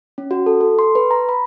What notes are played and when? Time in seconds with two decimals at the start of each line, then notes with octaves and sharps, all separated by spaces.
0.18 C#4
0.31 F#4
0.46 A4
0.61 A4
0.79 C6
0.95 B4
1.11 A#5
1.29 B5